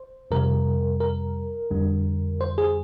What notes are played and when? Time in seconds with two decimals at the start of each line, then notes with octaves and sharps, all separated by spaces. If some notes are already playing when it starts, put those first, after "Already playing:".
Already playing: C5
0.31 F2 C3 G3 A#4
1.00 A#4
1.71 F2 D3 G3
2.41 C5
2.58 G#4